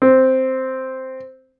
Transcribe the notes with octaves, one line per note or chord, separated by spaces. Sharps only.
C4